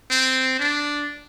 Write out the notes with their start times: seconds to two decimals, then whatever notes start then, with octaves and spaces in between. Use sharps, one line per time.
0.11 C4
0.60 D4